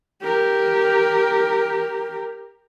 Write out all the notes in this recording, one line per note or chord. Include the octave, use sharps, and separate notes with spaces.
G4 A#4